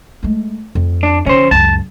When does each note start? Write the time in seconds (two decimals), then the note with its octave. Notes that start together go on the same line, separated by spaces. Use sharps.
0.23 G#3 A3
0.75 F2
1.03 D4
1.26 D3 F3 C#4 C5
1.51 C#2 F#2 A5